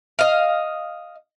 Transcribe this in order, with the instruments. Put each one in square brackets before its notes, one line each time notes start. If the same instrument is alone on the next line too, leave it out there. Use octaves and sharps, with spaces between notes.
[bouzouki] D#5 F5